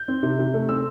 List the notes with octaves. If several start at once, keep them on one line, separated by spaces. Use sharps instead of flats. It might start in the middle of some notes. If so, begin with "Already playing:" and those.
Already playing: G6
C4
C3
C3
A3
C4 E6